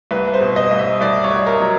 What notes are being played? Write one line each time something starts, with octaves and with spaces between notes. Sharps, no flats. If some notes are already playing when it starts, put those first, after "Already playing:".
C2 B4
C5
B2
D#5
C2
E5
C2 D5
C#5
C2
A#4
F#3